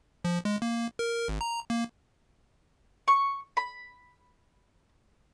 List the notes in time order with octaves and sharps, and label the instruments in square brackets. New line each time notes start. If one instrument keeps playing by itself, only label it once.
[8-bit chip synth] F3
G#3
A#3
A#4
G#1
A#5
A#3
[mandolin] C#6
B5